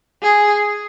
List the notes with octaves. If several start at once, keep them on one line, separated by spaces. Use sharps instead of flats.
G#4